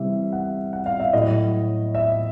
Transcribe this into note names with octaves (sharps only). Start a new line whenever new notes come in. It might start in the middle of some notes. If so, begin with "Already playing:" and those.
Already playing: C3 E3 G3 E5
F#5
F#5
F5
E5
A2 F#3 D#5
E5